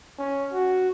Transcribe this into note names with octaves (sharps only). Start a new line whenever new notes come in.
C#4
F#4